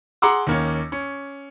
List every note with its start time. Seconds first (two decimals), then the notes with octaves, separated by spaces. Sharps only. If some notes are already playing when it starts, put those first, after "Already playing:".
0.22 G#4 F#5 A#5 C6 D6 E6
0.47 D#2 A#3 C#4
0.92 C#4